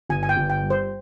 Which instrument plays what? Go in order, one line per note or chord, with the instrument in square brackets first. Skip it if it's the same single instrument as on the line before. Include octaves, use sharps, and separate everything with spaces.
[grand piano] G1 [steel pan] G#5
[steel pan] G#5
G5
[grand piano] G1
[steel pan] G5
[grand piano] G3
[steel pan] C5